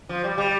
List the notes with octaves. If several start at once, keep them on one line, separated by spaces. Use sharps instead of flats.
F3
G3
G3